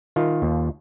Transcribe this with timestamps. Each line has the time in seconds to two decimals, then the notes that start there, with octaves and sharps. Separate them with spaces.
0.16 D#3 F4
0.42 D#2